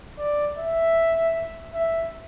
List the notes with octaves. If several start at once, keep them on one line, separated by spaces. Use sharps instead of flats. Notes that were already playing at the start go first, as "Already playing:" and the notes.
D5
E5
E5